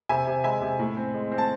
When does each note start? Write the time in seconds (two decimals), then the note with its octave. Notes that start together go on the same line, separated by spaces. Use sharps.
0.09 C3 E5 G#5
0.27 C3
0.44 G#3 E5 G#5
0.62 C3
0.79 A2
0.97 C4
1.14 G#3
1.32 C4
1.38 A5